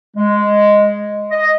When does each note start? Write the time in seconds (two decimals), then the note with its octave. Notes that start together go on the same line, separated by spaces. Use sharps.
0.17 G#3
1.31 D#5